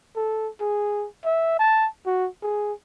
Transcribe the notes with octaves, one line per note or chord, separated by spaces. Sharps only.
A4
G#4
E5
A5
F#4
G#4